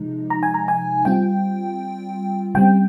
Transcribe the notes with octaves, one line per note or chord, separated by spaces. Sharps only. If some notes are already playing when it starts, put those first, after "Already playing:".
Already playing: C3 F3 G#3 D#4
A#5
G#5
A#5
G#5
G3 C4 F4 G5
C#3 G3 C4 G5